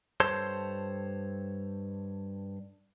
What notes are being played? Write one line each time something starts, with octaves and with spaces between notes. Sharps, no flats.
G2 A4 C5 C#5 A5 C6